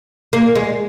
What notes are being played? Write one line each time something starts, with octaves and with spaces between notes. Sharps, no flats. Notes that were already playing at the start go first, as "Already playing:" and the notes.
A#3
G#3